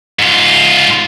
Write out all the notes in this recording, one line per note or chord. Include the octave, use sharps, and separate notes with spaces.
G#2 F4